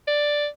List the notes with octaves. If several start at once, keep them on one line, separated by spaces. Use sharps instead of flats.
D5